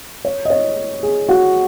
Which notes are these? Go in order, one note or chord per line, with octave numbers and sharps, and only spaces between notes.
C#5
D#5
C#5
G#4
F#4